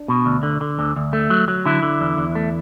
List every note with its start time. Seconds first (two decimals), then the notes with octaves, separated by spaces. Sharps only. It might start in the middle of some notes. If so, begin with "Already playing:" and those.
Already playing: D4
0.08 B2
0.26 D2
0.43 D3
0.61 D3
0.79 D2
0.96 D2
1.13 A3
1.30 F#3
1.48 F#3
1.65 D3 E4
1.83 D3
2.01 E2
2.17 E2
2.35 A3